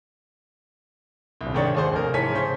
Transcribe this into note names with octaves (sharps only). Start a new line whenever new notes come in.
D#1 C2
G#2 D#3 D4 C#5 C#6 A6
D#2 G#4 C5
F1 A#4
G#2 E3 C#5 G#5 A5 B6
C#3 C5 C#6 B6